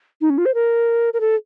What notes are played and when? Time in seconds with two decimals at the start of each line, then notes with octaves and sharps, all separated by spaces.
0.21 D#4
0.30 C#4
0.38 F4
0.46 C5
0.54 A#4
1.14 A#4
1.21 A4